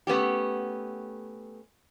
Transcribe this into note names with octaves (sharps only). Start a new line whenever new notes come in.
A3 B3 C#4 G4